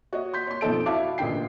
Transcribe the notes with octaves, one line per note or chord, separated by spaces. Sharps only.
F#4 C#5 D#5
C6 G6 B6
C#5 C6
B1 F2 D#4 A4 D7
E4 F#4 E5 F5 A5 D6
A1 A#2 D3 G5 C7